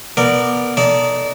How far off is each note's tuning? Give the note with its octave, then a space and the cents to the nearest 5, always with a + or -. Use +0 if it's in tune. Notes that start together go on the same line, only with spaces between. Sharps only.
B3 -15 A#4 -20 D5 +0
D#4 +0 A4 +0 D5 -30